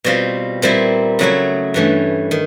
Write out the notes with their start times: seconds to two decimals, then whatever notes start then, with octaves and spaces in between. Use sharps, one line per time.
0.04 B2 G3 C4 F4
0.62 A#2 G3 C4 E4
1.19 C#3 F#3 A3 C#4 E4
1.74 G2 E3 A3 C#4
2.31 D#3